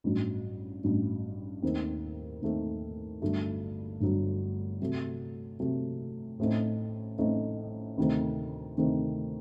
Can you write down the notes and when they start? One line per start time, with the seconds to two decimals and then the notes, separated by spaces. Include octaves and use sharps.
0.04 A1 G2 F#3
0.84 A1 G2 F#3
1.62 D#2 D#3 A3 C4
2.42 D#2 D#3 A3 C4
3.22 G1 G2 F#3 A3
4.01 G1 G2 F#3 A3
4.81 C3 F#3 A3
5.60 C3 F#3 A3
6.39 A1 A2 A3 C4 D#4
7.18 A1 A2 A3 C4 D#4
7.98 D2 C3 D#3 A3 C4
8.77 D2 C3 D#3 A3 C4